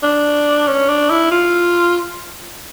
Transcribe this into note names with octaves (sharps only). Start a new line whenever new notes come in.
D4
C#4
D4
E4
F4